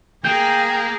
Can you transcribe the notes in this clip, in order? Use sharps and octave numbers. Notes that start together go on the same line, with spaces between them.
A#3 G#4 A#4 G5 G6